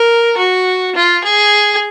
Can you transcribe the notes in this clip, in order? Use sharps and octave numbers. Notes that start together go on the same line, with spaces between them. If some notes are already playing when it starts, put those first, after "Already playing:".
Already playing: A#4
F#4
F4
G#4